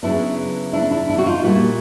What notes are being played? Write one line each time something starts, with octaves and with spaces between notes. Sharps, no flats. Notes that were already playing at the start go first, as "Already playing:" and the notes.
C#3 F#3 B3 D4 E4
D4 E4
D4 E4
D4 E4
F#4
D#4 F4
A#2 G3 A#3 E4 F#4